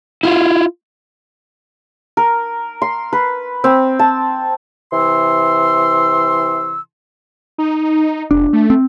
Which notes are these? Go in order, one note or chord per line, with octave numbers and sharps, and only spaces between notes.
E4 F4
A#4
C6
B4
C4
A5
C3 E3 C6 E6
D#4
F1 D4
A3
C4